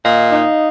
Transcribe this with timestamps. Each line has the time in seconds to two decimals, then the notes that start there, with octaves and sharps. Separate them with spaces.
0.04 A#2 D#5 F5
0.32 D#4